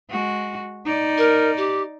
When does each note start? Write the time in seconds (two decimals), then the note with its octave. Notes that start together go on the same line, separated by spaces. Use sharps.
0.10 G#3 F#4
0.85 D#4 D5
1.17 A#4
1.57 G4